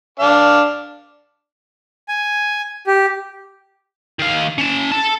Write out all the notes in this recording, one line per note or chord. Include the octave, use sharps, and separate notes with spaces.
D4 F5
G#5
G4
D#3 F5
C#4 A5
A4 A5